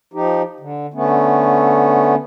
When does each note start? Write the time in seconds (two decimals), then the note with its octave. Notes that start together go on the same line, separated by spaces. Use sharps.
0.14 F3 D#4 G4
0.60 D3
0.94 D3 A3 B3 C#4